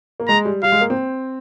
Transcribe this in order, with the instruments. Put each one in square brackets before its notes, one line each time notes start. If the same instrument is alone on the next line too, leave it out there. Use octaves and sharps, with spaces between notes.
[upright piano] A#3
[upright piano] G#3 [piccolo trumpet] A#5
[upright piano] G3
[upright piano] G3 [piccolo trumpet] F5
[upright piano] G#3
A#3
C4